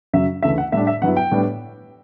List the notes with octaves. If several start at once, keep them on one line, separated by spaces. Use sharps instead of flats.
F#2 C#3 F#3 E5
D2 C#3 E3 A3 E5
F#5
A2 G3 D4 E5
E5
G2 F#3 B3 E4 F#5
G5
A2 G3 B3 D4